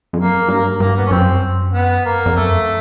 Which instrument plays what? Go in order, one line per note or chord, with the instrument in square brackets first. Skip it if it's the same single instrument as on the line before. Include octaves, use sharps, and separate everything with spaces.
[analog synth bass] F2
[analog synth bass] F#2 [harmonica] A#3
[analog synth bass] G2 [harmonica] A#3
[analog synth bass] G2 [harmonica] A#3
[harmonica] B3
C#4
[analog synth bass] F#2 [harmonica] C4
[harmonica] B3
A#3
[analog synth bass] F2
[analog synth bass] F#2 [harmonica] A3